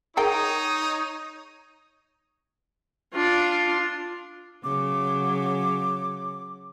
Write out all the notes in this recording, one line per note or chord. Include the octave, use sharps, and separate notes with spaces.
D#4 G#4 A#4 C#5 G5 D#6
D4 F4
C#3 F#3 D6